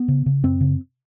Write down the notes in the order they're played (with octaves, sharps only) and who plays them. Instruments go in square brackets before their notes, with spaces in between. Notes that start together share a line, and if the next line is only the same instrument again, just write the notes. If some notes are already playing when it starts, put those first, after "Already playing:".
Already playing: [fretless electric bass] B3
C#3
C#3
F#2 C4
C#3